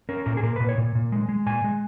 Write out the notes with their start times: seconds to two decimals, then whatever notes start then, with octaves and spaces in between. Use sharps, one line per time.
0.09 C#4 A#4
0.26 A#2 A#4
0.37 G#4
0.43 A#2 A#4
0.56 B4
0.60 A#2
0.69 C#5
0.78 A#2
0.95 A#2
1.12 G#3
1.29 G#3
1.46 A#2 G#5
1.64 G#3